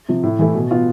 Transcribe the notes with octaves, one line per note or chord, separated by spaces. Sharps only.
C3 F3
A2
E3 A3 E4
B2
B3 F4